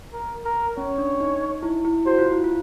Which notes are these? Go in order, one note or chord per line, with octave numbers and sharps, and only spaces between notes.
A#4
A#4
C#4 C#5
D4
D#4
D#4
E4
E4
F#4 C5
F4
E4
F4